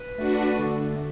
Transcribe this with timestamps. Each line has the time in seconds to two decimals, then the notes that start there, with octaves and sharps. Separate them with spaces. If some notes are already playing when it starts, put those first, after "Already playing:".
Already playing: B4
0.18 A3 D4 F#4
0.58 D3